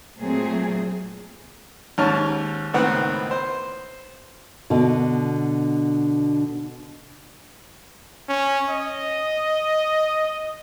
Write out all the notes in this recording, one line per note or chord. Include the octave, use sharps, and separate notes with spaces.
A#2 F#3 A3 C4 G#4
D#2 G#2 C#4 C#5 A5 F6
C#2 A2 D#3 B3 C4 F#5
C5
B2 D3
C#4
D#5